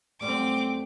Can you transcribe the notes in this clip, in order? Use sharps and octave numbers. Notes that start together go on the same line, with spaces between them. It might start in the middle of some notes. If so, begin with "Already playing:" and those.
F#2 G3 A3 C4 D6